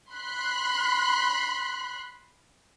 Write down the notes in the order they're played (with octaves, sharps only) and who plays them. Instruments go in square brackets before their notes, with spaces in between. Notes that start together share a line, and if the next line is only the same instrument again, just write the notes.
[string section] B5 C6 F#6